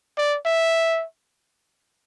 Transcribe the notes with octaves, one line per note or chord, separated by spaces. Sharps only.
D5
E5